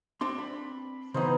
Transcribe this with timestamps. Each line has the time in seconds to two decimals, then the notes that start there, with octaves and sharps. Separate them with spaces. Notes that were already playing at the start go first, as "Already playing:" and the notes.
0.21 C4 D4 C6
0.38 B5
1.14 C#3 E3 B3 D#4 C5